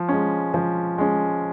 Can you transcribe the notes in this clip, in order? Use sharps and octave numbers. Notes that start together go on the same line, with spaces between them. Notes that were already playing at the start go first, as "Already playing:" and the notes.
Already playing: F3
G#3 C#4
F3
G#3 C#4